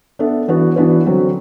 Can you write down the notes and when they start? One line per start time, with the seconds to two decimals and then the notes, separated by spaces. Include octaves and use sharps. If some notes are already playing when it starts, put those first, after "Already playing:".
0.19 B3 D4 A4 E5
0.48 E3 B3 D4 F#4 B4
0.76 E3 B3 D4 F#4 B4
1.05 D3 F#3 C4 F#4